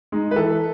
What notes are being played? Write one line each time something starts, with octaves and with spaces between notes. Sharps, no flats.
G#3 D#4
B4
E3 A4